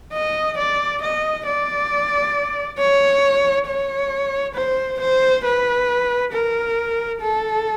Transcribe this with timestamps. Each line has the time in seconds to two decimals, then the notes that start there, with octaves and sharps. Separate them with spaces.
0.13 D#5
0.58 D5
1.02 D#5
1.46 D5
2.78 C#5
3.67 C#5
4.55 C5
5.00 C5
5.45 B4
6.32 A#4
7.21 A4